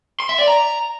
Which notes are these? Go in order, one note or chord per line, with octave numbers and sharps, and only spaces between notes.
C6
E5
D5
A#5